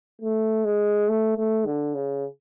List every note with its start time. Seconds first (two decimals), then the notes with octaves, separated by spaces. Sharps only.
0.21 A3
0.65 G#3
1.08 A3
1.37 A3
1.66 D3
1.94 C#3